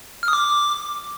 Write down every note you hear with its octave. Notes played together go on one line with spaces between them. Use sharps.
F6
D#6
D6